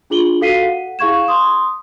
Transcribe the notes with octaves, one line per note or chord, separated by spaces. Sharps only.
D4 F4 G#4 F#7 G7
F#4 A4 F5 B6 C7 D#7
F#5
E4 G#4 F5 C#6 G#6 E7
C6 D#6